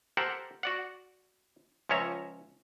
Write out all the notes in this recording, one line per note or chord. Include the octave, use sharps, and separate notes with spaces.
G4 A4 A#4 C5 F#5
F#4 D5 F#5
C#2 F3 C#4 C#5 E5 A#5